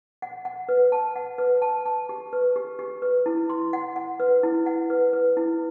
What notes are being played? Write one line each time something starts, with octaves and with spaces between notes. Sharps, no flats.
F#5
F#5
B4
A5
F#5
B4
A5
A5
G4
B4
G4
G4
B4
E4
C6
F#5
F#5
B4
E4
F#5
B4
B4
E4